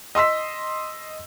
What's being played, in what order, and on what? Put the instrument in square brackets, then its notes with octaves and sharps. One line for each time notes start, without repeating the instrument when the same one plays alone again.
[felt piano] D#5 C6 E6 B6